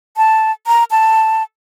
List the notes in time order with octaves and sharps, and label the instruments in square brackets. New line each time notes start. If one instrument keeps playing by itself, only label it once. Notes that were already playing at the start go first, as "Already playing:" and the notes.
[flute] A5
A#5
A5